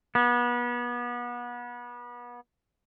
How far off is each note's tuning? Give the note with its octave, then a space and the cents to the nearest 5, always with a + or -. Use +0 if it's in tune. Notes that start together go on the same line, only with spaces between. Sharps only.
B3 -30